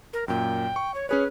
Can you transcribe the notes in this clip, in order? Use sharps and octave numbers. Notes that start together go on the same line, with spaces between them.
A#4
F#2 A#2 G5
C#6
C#5
C#4 G#4 B4 C#5